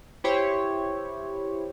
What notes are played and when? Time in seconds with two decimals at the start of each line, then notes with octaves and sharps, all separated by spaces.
0.24 E4 G4 C5 C#5